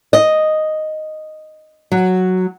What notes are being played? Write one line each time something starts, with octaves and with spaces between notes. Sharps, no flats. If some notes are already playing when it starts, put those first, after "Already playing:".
D#5
F#3